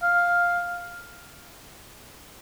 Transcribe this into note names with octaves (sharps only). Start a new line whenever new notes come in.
F5